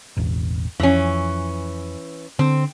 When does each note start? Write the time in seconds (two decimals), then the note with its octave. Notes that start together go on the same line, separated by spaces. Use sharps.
0.17 E1 A1
0.80 F2 E3 C#4
2.39 D3 C4